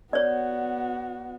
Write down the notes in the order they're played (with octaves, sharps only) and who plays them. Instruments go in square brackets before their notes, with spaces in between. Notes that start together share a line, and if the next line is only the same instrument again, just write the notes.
[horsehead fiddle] B3 F#4 [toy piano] C#5 D5